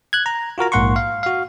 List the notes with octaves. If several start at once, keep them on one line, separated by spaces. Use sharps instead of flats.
F#6 G#6
A#5
F4 F#4 A#4 A#5
A#1 G#2 A#3 F#5 C6 C#6
F5
F#4 F5